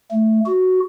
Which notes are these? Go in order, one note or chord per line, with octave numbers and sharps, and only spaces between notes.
A3
F#4